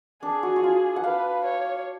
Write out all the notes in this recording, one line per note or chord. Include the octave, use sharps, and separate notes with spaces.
D4 G#4
F#4
F#4
F4
F#5
B4 F5
C#5